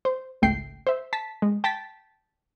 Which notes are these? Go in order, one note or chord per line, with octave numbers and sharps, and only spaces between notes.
C5
G#1 C#2 A3 G5 C7
C5 E5
A5 B6
G#3
G5 A5 A6 B6